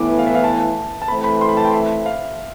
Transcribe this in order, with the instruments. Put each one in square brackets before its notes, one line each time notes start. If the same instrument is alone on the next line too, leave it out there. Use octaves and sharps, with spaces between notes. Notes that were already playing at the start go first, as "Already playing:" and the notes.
Already playing: [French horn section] A2 E3 B3 E4 [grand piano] D6
[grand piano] F5
E5
F5
A5
A5
[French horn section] E3 A3 C4 [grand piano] B5
[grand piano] B5
C6
B5
A5
G5
E5
F5